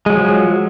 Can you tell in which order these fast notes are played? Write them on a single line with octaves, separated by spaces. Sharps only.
G#3 F#3 F3